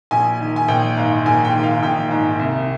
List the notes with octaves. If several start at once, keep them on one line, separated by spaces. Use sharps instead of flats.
A#1 G#5
D#3
G#5
A#1 G5
G#2 F5
A#1 G#5
G5
D#3
F5
A#1 G5
G#2
C2